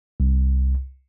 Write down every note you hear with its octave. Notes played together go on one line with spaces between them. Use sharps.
C2